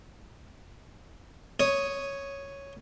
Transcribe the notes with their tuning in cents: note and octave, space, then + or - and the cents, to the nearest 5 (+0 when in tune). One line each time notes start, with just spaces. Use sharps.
C#5 +0 D#6 +0